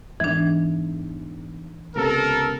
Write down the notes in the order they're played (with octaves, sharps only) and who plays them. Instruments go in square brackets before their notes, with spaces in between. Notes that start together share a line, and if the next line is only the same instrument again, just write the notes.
[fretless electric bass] E2 G#2 [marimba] E3 D4
[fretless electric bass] C#2 C3 B3 [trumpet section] A4 A#4